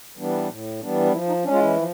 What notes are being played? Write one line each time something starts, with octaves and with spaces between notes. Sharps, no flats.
E3 G3 B3 D4
A2
E3 G3 B3 D4
E3 F3 E4
D#4
G#3 C#4 D4
F4
E3 E4
F3